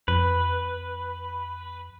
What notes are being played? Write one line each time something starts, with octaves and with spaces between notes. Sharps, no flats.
F2 B4